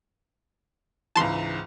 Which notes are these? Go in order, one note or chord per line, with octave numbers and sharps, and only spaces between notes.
C#2 G#2 E3 A5 C6